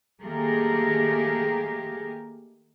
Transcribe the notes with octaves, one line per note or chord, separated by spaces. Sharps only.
D#3 A3 A#3 G4 G#4 A#4